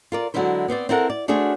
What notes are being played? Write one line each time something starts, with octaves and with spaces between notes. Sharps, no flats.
F4 A#4 D5
D3 F#3 G#3 C#4 E4 C5
B3 C4 C5 D5
C4 E4 A4 A#4 F#5
D5
A3 D4 F#4 G#4 C5 C#5